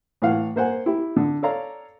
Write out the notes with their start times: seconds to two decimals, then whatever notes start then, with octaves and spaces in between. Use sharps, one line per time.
0.22 A2 E3 F5 F#5
0.56 A#3 C5 F#5 G#5
0.86 E4 G4
1.16 D3
1.42 A4 C#5 D5 F5 A#5